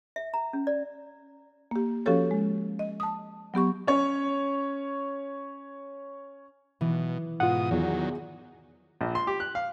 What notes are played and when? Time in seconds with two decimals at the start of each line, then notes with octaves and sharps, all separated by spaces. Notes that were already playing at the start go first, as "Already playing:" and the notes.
0.16 E5
0.34 A#5
0.53 C#4
0.67 D5
1.71 A#3 G4
2.06 F3 C#4 F#4 G4 A4 C#5
2.31 G#3
2.79 D#5
3.00 A5 D#6
3.54 F#3 B3 G4 C#6
3.87 C#4 C#5
6.81 B2 E3
7.40 G#2 B2 F4 F#5 D#6
7.71 E2 D#3 F#3
9.01 A#1
9.15 C6
9.27 G4
9.40 F#6
9.55 F5